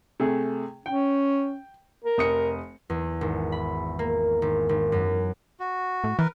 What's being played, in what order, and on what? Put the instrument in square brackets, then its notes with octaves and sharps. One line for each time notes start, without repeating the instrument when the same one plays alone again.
[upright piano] C3 A3 G#4
[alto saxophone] C#4 [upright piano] G5
[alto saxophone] A#4
[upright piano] F1 D#6 C#7
[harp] E2
G#1
B5
A#3
G#1
G#1
F#2
[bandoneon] F#4
[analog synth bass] A2
[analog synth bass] E3 [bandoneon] A#4 B4